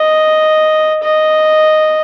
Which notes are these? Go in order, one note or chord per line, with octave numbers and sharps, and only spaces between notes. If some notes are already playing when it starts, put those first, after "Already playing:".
Already playing: D#5
D#5